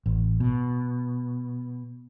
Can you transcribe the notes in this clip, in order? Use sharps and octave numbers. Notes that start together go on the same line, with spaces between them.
A1
B2